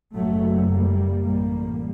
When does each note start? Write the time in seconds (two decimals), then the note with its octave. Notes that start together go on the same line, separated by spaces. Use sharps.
0.15 F#1 F#2 F#3 A3
0.70 G3 A#3
1.25 A1 A2 G3 A#3